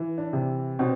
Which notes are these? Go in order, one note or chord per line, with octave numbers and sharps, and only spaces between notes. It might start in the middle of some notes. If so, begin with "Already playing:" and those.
Already playing: E3
D4
C3
B2 C4